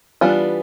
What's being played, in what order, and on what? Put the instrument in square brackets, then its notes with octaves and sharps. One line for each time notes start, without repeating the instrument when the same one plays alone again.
[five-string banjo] E3 G3 B3 D4 F4